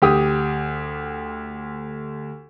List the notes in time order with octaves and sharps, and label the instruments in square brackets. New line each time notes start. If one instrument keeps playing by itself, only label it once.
[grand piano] D2 G4 D#6